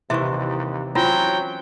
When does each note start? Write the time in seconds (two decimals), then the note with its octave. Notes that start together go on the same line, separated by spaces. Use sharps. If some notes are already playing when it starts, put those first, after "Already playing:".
0.10 D#2 C3 E3 E5 C#6
0.95 F#3 C4 C#4 E4 F4 G5